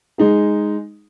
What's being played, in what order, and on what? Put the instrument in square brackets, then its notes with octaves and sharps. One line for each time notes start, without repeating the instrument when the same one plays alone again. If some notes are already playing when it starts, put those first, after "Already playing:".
[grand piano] G#3 D#4 G#4